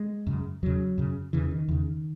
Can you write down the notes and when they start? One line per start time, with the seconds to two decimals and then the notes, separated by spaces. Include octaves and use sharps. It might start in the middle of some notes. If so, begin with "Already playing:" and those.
Already playing: G#3
0.27 F#2 C#3
0.63 E2 C#3 F#3
0.98 F#2 C#3
1.33 E2 C#3 E3
1.51 D#3
1.69 E2 C#3